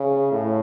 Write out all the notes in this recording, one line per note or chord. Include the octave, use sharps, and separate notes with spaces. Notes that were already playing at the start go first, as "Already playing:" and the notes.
Already playing: C#3
A2